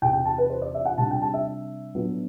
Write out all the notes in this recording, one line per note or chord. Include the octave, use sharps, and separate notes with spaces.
E2 C3 E3 G5
G5
A5
B4
C5
D5
E5
F#5
C3 G3 D4 A5
G5
A5
E5
A2 F#3 B3 D4